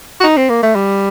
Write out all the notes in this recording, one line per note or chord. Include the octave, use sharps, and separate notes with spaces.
F#4
D#4
C4
A#3
A3
G3